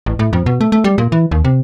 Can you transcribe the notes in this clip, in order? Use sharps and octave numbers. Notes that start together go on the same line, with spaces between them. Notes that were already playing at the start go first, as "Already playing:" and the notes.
A1
A2
F2
B2
A3
A3
G3
A#2
E3
D#2
C3